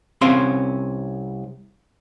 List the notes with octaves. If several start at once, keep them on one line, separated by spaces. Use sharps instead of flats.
C2 C4 C#4 F5 C6